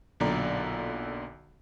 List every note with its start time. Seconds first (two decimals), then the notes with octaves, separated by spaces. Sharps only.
0.20 B1 A#2 D3 D5 A#5